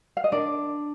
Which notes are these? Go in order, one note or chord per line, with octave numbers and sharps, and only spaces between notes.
F5
D#5
D4 A#4 D5